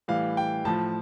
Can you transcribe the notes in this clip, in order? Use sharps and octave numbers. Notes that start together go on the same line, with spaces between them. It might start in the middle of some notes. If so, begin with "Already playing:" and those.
A2 E3 G3 F5
G5
A2 F3 A5